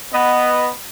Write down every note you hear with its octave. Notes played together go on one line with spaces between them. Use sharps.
B3 D#5